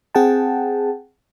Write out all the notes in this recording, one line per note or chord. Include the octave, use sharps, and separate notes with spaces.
C4 G#4 F#5 G5 A5